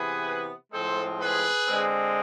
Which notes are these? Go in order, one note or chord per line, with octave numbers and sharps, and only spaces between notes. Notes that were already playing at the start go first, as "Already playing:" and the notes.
Already playing: C3 E3 B3 G#4 B4
A2 F3 G#3 C4 A4 C5
G#4 B4
D3 G#3 C4